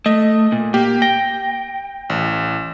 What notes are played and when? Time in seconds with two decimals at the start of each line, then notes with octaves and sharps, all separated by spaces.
0.06 A3 D#5
0.52 A#2
0.74 A#3 G4
1.02 G5 A#6
2.10 A1